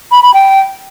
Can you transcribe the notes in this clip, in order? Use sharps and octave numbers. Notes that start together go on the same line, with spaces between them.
B5
B5
G5